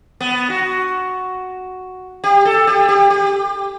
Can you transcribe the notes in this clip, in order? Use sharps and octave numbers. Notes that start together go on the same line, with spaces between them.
B3
F#4
G4
A4
G4
G4
G4